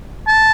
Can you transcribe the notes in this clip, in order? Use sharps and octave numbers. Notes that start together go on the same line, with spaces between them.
A5